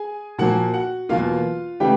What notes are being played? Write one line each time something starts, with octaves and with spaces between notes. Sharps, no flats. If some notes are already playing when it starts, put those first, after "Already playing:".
Already playing: G#4 G#5
A#2 F3 A#3 F#4 F#5
F#4 F#5
E2 B2 F#3 A#3 F4 F5
C#3 E3 A3 G4 G5